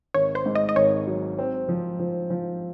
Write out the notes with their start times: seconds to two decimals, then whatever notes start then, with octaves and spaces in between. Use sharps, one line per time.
0.14 G#1 C#5
0.35 C5
0.46 G#2
0.55 D#5
0.69 D#5
0.76 G#1 C#5
1.07 F#3
1.39 C4
1.69 F3
1.99 F3
2.30 F3